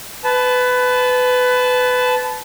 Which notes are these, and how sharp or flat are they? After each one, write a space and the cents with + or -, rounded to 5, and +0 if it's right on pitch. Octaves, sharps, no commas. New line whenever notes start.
B4 +20 A5 -20